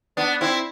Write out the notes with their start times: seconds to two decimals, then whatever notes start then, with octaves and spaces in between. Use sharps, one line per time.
0.17 B3 D4
0.41 C4 E4